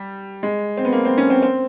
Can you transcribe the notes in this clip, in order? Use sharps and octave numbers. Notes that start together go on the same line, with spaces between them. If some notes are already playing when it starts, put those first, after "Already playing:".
Already playing: G3
G#3
C4
B3
A#3
C4
C#4
C4
C4